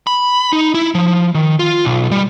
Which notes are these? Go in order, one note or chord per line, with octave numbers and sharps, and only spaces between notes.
B5
D#4
E4
F3
D#3
F4
B1
G3